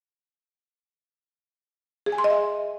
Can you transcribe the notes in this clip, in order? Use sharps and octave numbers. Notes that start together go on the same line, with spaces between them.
G#4
G#5
C6
D#5
E5